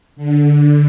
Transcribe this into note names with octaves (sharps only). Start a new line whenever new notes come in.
D3